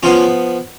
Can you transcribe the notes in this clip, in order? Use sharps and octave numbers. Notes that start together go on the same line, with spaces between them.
F3 B3 C#4 F4